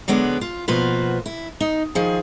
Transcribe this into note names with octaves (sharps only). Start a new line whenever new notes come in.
D3 F#3 G#3 B3 D4
F4
B2 F3 A#3 F4 F#4 B4
E4
D#4
D#3 F3 G#4